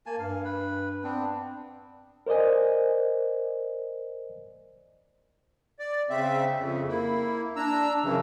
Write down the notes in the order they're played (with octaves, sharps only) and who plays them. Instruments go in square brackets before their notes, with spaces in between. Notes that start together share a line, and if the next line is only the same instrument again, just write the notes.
[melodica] A#3 G#5 A5
[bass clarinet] G2 [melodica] F5
[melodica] B4
[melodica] B3 D4 [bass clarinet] C4
[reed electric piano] A#4 C5 D5 D#5 G#5
[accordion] D5
C#3 C4 E5
F2 C#3
A#3 E4
D4 A#5 E6
F#2 C#3 E3